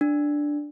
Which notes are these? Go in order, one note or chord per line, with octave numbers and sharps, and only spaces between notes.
D4